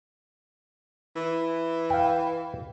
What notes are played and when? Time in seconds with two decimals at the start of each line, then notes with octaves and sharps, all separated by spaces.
1.16 E3
1.90 F5 G5